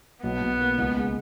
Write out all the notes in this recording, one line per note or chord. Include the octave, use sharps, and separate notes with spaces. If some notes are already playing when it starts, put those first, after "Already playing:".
B1 B3
B1
A#3
C#2
G#3